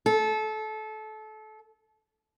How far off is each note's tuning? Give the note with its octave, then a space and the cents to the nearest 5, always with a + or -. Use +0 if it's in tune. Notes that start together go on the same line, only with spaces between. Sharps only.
A4 -25